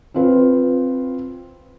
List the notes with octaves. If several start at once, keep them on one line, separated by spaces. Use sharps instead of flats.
C4 F4 B4